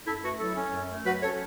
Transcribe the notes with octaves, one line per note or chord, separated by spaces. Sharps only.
F#2 E4 A4
A3 F#4 B4
F#3 E4 A4
C#4
F#2
A3
F#3 F#4 B4
C#4 A4 C#5